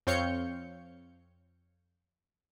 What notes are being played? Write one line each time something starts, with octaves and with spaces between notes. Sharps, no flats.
F2 C4 C#5 F5 G6 C#7